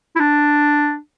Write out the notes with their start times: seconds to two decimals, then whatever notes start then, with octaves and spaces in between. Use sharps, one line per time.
0.16 E4
0.19 D4